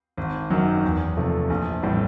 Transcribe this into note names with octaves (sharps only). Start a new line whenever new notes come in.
G#1
F#2 D#3 F#3
E2
C3 F3 A3
A#1
A2 E3 G3 C4